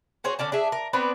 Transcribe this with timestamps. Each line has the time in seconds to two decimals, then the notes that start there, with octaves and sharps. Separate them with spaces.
0.24 F#4 G#4 C5 C#5
0.39 D3 C#4 D5 A5
0.52 D4 G#4 E5
0.72 A#4
0.93 B3 C4 D4 B4